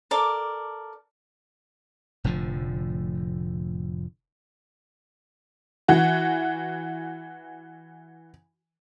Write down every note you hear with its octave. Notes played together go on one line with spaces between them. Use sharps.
A4 A#4 D5 D6
F1 A2 D3 F3
E3 F#4